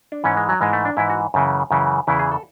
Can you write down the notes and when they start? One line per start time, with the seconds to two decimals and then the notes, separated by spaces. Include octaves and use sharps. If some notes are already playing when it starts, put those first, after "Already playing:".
0.12 D4
0.24 G#2 E3 C#4
0.37 G#3
0.49 F#3
0.61 G#2 E3 G#3
0.73 A3
0.85 D4
0.97 G#2 E3 E4
1.10 F#4
1.34 F#2 C#3 E3
1.71 F#2 C#3 E3
2.07 E2 C#3 E3 E4
2.19 G#4
2.32 A4